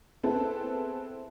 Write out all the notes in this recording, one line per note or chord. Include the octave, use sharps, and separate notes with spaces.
B3 C4 E4 G#4 A4 B4